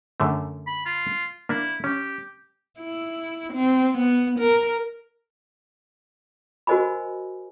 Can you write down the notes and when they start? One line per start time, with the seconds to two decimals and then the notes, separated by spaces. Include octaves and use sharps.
0.20 F#2 D3 A3
0.67 B5
0.85 F4
1.49 A#3 D4 E4
1.84 C#4 G4
2.79 E4
3.53 C4
3.97 B3
4.39 A#4
6.67 F#4 A#4 C5 D#5 G#5 B5